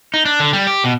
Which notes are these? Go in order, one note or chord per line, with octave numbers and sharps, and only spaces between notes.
D#4
D4
D3
G3
G4
B2